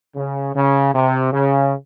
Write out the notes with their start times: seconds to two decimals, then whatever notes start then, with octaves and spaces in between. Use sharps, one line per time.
0.16 C#3
0.55 C#3
0.94 C3
1.32 C#3